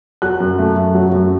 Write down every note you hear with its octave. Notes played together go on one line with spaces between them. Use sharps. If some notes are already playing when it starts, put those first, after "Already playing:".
F#3 F#6
F#2
A3
F#2
F#3
F#2